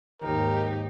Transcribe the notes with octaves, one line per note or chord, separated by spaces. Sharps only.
D#2 G#2 D#4 G4 A#4